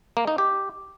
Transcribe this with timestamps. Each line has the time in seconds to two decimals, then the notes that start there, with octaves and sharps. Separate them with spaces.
0.17 A#3
0.27 D#4
0.38 G4